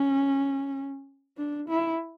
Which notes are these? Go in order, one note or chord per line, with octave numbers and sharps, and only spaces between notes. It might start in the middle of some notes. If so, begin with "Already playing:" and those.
Already playing: C#4
D4
E4